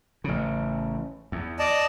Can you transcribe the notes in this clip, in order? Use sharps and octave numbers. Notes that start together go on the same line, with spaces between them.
A1 C#3
E2
D5 D#5 A5